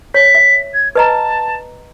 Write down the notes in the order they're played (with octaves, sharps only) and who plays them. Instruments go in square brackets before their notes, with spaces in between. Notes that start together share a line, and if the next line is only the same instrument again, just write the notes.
[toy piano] C#5 [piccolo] B6
[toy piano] E5
[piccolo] G#6
[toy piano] B4 D#5 A#5 [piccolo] A5